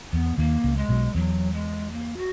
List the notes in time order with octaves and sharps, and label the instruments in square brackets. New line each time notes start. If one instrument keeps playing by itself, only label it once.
[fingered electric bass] E2 [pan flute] B3
[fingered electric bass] D#2 D#3 [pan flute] A#3
[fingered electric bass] C#2 C#3
[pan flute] G#3
[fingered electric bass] B1 B2
[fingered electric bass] E2 [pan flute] F#3
[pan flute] G#3
A#3
F#4